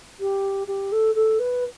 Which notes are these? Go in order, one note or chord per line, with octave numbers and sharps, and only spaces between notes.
G4
G4
A4
A4
B4